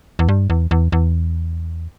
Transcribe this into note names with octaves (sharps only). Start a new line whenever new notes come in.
E2
G2
E2
E2
E2